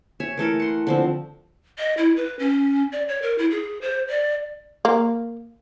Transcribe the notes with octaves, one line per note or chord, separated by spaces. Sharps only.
C#5 E5 G#5
E3 A3 A4 A#4
F#5 C6
D3 F3 C4
D#5
E4
B4
C#4
D5
C#5
A#4
E4
G#4
C5
D5
A#3